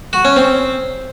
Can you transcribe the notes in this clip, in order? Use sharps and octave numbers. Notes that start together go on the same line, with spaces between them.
F#4
C#4
C4